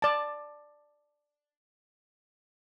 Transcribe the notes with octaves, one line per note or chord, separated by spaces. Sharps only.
D5 A5